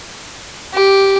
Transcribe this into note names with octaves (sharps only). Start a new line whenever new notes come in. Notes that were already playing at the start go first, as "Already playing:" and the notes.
G4